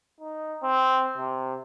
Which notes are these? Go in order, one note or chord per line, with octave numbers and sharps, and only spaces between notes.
D#4
C4
C3